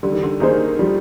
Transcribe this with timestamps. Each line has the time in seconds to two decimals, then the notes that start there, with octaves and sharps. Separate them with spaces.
0.03 D3 G3
0.12 D#3
0.23 D3
0.40 D#3 A#3 D#4 G#4 C5
0.79 F3 G3